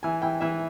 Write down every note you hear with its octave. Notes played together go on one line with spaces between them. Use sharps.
E3 G#5
E3 G5
E3 E5